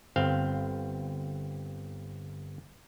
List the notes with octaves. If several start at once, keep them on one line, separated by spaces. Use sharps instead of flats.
G1 C4 F5